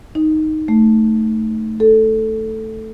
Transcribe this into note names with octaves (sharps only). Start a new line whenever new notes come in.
D#4
A3
A4